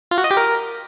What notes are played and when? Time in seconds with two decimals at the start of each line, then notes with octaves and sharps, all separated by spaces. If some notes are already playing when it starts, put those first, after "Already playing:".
0.11 F4
0.18 F#4
0.24 D#5
0.31 G4
0.37 A#4